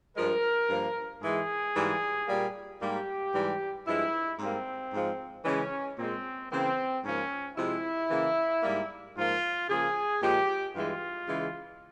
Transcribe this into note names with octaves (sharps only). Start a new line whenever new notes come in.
G2 F3 G#3 A#4
G2 F3 A#3
G#2 E3 G#3 G#4
G#2 E3 G3 A#3
A#2 G3 A#3
G#2 G3 A#3 G4
G#2 E3 G3
G2 F3 G#3 E4
G#2 G3 A#3 C4
G#2 F3 G#3
C#3 E3 G#3 C#4
A#2 G#3 C4
C#3 E3 A#3 C4
G#2 F3 A#3 C#4
C3 F3 G#3 E4
C#3 E3 A#3
G#2 G3 A#3
G#2 F3 A#3 F4
C#3 F3 A#3 G#4
A#2 F3 G#3 G4
G2 E3 G#3 F4
C#3 E3 G#3